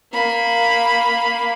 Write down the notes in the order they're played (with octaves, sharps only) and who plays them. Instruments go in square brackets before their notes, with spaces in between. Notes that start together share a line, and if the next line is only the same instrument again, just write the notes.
[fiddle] A#3 B5